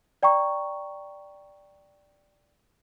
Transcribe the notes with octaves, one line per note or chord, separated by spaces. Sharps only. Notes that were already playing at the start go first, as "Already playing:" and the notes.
D5 G5 A#5 C#6